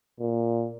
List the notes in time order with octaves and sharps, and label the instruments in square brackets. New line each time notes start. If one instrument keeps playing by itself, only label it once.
[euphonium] A#2